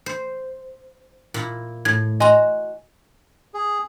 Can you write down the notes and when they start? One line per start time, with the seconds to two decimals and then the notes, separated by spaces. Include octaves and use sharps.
0.06 C5
1.34 A#2 E4
1.85 A2 G#6
2.20 F#4 D#5 G#5 A#5 C6
3.54 G#4